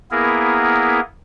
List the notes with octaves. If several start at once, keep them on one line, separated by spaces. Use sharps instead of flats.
A#3 B3 E4 G#4 A#4